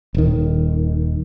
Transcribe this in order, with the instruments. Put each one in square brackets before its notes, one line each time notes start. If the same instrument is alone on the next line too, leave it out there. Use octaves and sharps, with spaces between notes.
[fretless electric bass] D#1 D#3